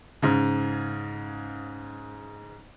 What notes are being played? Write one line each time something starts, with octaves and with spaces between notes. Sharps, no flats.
G#2 C#3